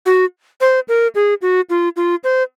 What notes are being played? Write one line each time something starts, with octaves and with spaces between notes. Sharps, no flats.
F#4
C5
A#4
G#4
F#4
F4
F4
C5